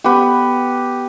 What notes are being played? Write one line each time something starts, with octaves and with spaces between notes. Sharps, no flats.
B3 G4